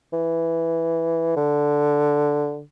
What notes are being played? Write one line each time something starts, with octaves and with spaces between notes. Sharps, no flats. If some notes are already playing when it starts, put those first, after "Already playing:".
E3
D3